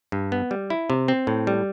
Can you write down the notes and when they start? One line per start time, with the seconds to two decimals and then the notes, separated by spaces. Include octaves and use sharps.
0.12 G2
0.32 B3
0.51 G3
0.70 E4
0.90 C3
1.08 C4
1.27 A2
1.47 G3